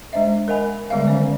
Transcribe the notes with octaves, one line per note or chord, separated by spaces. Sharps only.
G#3 D4 C5 D#5 E5
A#4 D#5 F5 F#5 G#5 B5
D3 G3 G#3 B3 E5 F5
D#3 F#3 C#4 C5 D5 G#5